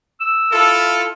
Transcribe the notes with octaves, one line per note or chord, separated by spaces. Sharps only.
E6
E4 F4 A4